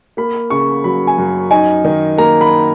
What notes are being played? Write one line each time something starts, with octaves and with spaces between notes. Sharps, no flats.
A#3 B5
C#3 C#6
F#3 B5
G#5
F#2
D#4 G#5
D#3
A#3 A#5
B5